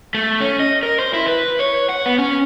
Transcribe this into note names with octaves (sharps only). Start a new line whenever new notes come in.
A3
C#4
D#5
A#4
C5
E4
B4
C#5
F#5
B3
C#4